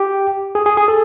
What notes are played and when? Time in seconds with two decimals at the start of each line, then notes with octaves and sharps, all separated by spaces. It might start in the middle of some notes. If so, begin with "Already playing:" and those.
Already playing: G4
0.55 G#4
0.66 G#4
0.77 G#4
0.88 A4